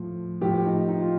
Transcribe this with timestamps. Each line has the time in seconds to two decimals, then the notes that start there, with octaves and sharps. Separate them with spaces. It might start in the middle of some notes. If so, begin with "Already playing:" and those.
Already playing: A2 F3
0.41 A2 F3 G4
0.65 D#4
0.88 D#4
1.01 F4